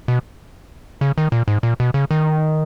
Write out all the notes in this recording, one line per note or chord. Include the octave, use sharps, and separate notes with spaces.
B2
C#3
D#3
A#2
G#2
A#2
B2
C#3
D#3